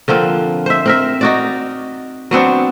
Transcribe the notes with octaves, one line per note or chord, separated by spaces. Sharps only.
D3 F3 A#3 C4
C5 E5
C4 A#4 E5
D#4 F#4 D5
F#3 B3 C4 D4